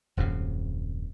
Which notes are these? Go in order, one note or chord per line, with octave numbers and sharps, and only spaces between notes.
D#1 F#2 C3